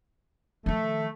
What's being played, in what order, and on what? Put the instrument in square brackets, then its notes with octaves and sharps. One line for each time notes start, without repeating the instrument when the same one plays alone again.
[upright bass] D#3 F3 [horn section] A3